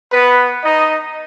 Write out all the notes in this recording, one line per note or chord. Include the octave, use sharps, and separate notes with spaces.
B3 B4
D#4 D#5